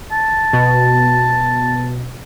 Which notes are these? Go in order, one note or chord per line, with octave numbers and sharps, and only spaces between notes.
A5
B2